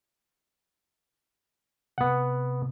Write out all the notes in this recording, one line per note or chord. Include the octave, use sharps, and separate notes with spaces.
C3 B3 F#5